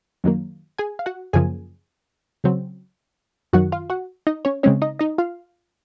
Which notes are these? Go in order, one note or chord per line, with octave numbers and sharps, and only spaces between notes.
F#2 D#3 F#3 A#3
G#4 G#5
F5
F#4 F#5
F#2 C#3 F3 A#3 G#4 G#5
C#3 F#3 C4
F#2 D#3 F#3 F#4 F#5
F4 F5
F#4 F#5
D#4 D#5
C#4 C#5
C#3 G#3 C4 C#4 C#5
D#4 D#5
D#4 D#5
F4 F5